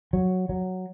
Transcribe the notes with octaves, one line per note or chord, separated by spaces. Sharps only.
F#3
F#3